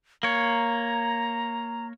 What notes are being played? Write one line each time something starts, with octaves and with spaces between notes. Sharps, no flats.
A#3 C#5 A#5